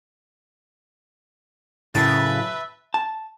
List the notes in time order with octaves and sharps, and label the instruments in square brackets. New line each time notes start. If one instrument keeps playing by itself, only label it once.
[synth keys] F#2 A2 [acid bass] C#3 [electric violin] B4 E5 [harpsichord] G5 A5
[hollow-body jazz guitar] A5